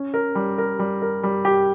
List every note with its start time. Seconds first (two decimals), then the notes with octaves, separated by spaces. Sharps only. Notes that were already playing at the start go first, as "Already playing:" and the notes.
Already playing: C#4
0.14 A#4
0.35 G3
0.58 A#4
0.79 G3
1.02 A#4
1.23 G3
1.45 G4